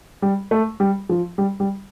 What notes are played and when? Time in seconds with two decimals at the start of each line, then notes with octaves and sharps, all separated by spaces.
0.22 G3
0.51 A3
0.80 G3
1.09 F3
1.38 G3
1.60 G3